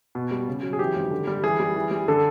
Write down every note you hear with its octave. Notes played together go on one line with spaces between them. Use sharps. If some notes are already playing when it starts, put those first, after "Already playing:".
B2
G3
C#3
F#3
G#4
E3 G4
G#1
D3
G3
E3 G#4
G3
E3
G3
D3 A4